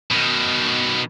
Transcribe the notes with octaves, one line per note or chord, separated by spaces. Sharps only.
B2 D#3